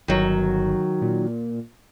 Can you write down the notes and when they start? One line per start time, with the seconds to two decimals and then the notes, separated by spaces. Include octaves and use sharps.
0.08 G1 D#3 F#3
1.02 A#2